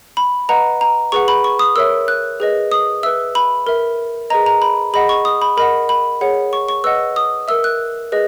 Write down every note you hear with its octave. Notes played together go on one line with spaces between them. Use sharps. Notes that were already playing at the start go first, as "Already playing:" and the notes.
B5
B4 D#5 F#5 A#5
A#5
G#4 B4 F#5 C#6
B5
C#6
D#6
A#4 C#5 E5 E6
F#6
G#4 B4 D#5
D#6
B4 E5 E6
B5
A#4 E5
G#4 B4 D#5 A#5
A#5
B5
G#4 D#5 F#5 B5
C#6
D#6
B5
A#4 D#5 F#5 B5
B5
G#4 C#5 F#5
C#6
C#6
B4 D#5 F#5 E6
D#6
A#4 E5 E6
F#6
G#4 B4 D#5